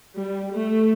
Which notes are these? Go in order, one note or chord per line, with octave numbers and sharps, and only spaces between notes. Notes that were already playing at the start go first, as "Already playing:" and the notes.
G3
A3